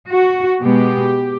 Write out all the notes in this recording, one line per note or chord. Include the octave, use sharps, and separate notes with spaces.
F#4
B2 G#3 B3 G4